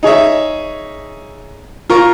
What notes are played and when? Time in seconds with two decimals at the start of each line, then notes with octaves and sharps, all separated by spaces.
0.03 D#4 G#4 C#5 E5
1.90 F4 A#4 C#6